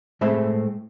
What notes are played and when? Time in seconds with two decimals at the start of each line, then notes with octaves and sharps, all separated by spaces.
0.21 A2 G#3 A3 C4 E5 B5